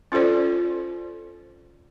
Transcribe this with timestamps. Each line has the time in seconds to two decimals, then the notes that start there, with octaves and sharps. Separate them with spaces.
0.12 C#4 F4 A4 C5 D5